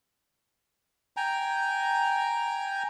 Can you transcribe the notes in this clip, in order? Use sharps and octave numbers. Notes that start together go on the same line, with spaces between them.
G5 G#5 A#5